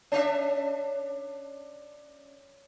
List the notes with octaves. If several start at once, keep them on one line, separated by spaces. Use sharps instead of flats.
C#4 D4 E5